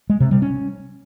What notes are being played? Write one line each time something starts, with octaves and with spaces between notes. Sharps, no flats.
G#3
C3
G3
C#4